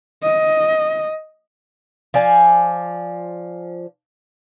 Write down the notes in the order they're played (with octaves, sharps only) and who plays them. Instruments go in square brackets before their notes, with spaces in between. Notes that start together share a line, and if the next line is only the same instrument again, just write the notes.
[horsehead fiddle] D#5
[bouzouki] F3 D5 G#5